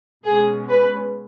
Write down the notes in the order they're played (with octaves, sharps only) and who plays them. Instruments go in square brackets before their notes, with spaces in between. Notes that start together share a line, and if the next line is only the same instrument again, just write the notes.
[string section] B2 G#3 C#4 G#4
B4